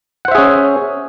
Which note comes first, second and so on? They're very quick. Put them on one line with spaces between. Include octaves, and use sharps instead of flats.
F#5 C5 E5 G#4 C#4